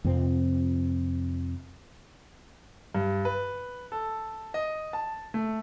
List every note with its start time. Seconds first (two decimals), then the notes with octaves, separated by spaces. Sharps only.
0.05 F2 C3 F3 C4
2.95 G2
3.25 B4
3.92 A4
4.54 D#5
4.93 A5
5.34 A3